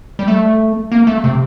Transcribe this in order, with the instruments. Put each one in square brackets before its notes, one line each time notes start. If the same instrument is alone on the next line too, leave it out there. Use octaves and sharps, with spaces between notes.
[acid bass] G3
A3
A#3
A3
C3